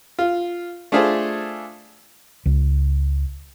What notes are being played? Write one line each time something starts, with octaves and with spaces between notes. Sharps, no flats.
F4
A3 D4 F4 G#4 A4 C5
C#2